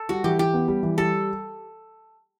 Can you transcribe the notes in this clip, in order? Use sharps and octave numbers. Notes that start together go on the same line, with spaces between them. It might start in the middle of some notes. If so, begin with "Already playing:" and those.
Already playing: A4
G3 F#4
E3 G4
E3 G4
B3
G3
E3
G3 A4